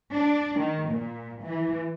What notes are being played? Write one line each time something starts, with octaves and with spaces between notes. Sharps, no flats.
D4
D#3
A#2
E3